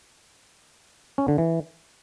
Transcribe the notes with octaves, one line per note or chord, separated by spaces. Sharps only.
C#4
D3
E3